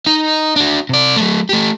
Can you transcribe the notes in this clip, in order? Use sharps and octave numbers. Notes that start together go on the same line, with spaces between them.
D#4 D#5
D4 F#4
C3 D5
F#3 A3
A3 G4